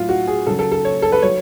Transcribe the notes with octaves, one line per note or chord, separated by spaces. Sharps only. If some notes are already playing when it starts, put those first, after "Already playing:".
Already playing: A2 F#3 F4
F#4
G#4
C#3 F#3 A4
A4
A4
C#5
A4
B4
F#3 C#5